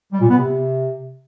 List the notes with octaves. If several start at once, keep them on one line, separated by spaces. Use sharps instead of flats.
G3
A#2
B3
C3